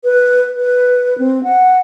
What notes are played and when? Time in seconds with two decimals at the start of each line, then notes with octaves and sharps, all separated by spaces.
0.04 B4
0.57 B4
1.18 C4
1.44 F#5